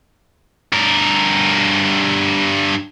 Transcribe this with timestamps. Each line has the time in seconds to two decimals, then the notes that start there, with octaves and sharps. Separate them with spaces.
0.73 G2 A#4